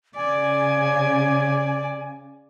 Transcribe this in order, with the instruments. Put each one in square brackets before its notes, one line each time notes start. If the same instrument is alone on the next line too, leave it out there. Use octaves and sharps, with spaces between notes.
[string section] C#3 [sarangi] D5 [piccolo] G#5